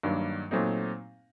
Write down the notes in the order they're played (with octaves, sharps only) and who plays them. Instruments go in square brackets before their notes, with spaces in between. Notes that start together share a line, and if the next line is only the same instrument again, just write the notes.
[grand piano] G2 D#3 F#3 A#3 D4
A#2 F#3 A3 C4 D#4